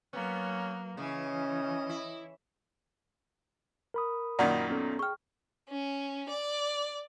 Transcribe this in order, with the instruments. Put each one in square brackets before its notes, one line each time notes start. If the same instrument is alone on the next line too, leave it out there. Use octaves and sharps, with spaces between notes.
[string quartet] F#3 A#3 [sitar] B3 [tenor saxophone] C#4
[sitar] C#3 [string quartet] E3 [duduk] C#4 [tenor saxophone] D#5
[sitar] E4
[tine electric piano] A#4 B5 D#6
[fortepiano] F#2 A#2 D#3 [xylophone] D5 F#5
[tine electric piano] B3 C#4 A4
[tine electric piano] G#4 G5 [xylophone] C#6 F6
[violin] C#4
D5